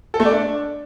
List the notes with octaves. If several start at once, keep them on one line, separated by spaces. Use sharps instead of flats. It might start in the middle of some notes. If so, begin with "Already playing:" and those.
A4
A3
D5
D4